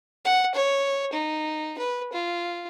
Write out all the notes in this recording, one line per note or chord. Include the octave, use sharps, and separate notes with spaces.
F#5
C#5
D#4
B4
F4